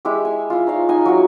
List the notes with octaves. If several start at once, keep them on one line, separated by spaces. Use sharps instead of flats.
G#3 E4 G4
G#5
E4 F4
D#4 C#5 F5
D#4 G#5
F#3 E4 F#4